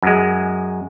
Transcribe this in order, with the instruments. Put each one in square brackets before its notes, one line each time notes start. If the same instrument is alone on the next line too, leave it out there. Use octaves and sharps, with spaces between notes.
[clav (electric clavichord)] F#2 G#3